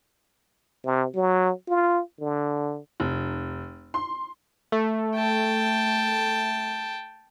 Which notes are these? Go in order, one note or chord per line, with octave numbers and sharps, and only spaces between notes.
C3
F#3
F4
D3
F1
C6
A3
G5 A5